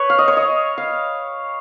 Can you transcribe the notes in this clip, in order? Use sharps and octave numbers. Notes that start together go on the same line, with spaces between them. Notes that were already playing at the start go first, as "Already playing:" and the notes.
Already playing: B4 C#5
F5
D#5
C#5
D#5
F5